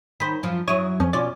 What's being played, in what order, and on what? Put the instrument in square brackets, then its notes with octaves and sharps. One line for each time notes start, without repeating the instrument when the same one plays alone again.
[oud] D#3 C5 [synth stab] B5
[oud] F#2 F3
[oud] F#2 F#3 E4 [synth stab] C#5 D#6
[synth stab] F2 [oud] C#4
[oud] B2 C#4 F4 [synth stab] D5